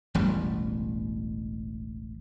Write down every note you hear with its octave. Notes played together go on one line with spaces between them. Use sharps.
E1 A1 B2 G3